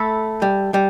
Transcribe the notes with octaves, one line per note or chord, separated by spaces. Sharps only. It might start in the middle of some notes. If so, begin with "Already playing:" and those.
Already playing: A3 A4 E5 B5
G3
G3